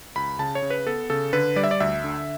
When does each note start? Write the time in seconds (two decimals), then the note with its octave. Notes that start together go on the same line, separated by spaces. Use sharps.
0.16 C#2 B5
0.39 C#3 A5
0.55 C#5
0.62 C#3
0.70 B4
0.87 B3 A4
1.10 C#3 A4
1.33 D3 B4
1.56 G3 D5
1.64 E5
1.71 D5
1.80 D2 E5
2.04 D3